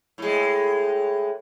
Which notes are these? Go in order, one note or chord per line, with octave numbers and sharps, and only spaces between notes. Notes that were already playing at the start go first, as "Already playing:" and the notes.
A2 G#3